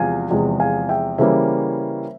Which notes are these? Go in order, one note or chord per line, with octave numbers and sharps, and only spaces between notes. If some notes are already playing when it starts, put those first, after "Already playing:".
Already playing: E2 C3 F3 G#3 F5 G#5
E2 C3 F3 G#3
F5 G#5
E5 G5
C#3 E3 G3 A#3 C#4 C5 E5